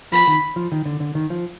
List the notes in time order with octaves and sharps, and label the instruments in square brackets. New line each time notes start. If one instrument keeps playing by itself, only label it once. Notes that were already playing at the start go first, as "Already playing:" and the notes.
[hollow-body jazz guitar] F3 [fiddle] B5
[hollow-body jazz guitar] D#3
F3
D#3
D3
D3
D#3
F3